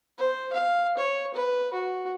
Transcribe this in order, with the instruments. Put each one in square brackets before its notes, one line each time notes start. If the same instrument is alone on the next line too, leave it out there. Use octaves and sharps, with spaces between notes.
[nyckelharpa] C5
F5
C#5
B4
F#4